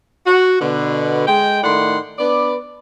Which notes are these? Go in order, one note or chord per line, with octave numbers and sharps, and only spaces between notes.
F#4
B2 D3
G#3 G5
A2 D#3 A3 D5 F#5 C6
B3 D4 B4 D5